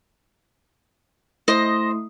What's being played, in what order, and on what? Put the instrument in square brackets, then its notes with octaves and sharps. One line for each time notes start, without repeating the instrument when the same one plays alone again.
[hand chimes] A3 E4 D#6 [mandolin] C5 D#5